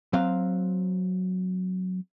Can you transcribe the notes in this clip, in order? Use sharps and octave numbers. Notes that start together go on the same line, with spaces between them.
F#3 C4 F5